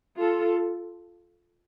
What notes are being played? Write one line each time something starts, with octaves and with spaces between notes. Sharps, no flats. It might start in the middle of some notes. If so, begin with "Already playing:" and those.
F4 A4